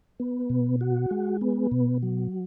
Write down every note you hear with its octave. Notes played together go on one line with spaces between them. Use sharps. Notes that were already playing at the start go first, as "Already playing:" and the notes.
B3
B2
F#4
G#3
B3
B2
F#3